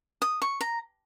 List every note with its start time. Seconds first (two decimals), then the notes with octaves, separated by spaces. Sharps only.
0.22 D#6
0.42 C#6
0.61 A#5